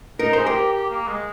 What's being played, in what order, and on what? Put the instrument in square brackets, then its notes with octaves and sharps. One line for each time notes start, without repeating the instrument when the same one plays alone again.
[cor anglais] D#4 [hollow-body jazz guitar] A#4
[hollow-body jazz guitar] C5
[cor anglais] G#4
[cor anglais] G4 [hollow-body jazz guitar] A#4
[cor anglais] G4
A#3
G#3